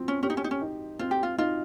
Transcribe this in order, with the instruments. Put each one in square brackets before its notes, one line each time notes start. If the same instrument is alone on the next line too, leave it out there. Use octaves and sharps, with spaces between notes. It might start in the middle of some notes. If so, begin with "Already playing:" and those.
Already playing: [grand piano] F3 C4
[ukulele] C#4
[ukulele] C#4 [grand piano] G4
[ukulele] D#4
C#4
D#4
C#4
[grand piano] D#4
[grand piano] C4 [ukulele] F4
[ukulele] G4
F4
[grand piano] D#4 [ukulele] F4